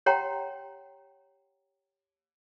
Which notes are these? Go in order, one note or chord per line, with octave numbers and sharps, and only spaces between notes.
G4 C#5 F#5 G5 A#5 C6